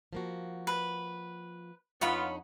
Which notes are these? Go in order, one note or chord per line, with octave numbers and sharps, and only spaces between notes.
F3 A#3 F#4
B4
F2 B3 D4 D#4 F4 C#5 F#5 B5